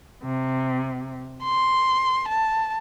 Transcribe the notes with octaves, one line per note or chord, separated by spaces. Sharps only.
C3
C6
A5